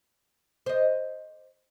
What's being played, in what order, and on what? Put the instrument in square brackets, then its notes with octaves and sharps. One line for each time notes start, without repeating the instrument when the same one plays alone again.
[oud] C5 D#5